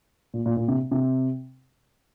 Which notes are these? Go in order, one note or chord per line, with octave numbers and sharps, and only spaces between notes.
A#2
A#2
A#2
C3
C3